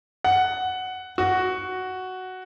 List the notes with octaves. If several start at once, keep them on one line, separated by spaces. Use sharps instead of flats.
F#5
F#4